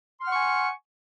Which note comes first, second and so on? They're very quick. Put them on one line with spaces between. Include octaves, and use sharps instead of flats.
C6 F6 F#5 C#6 G#5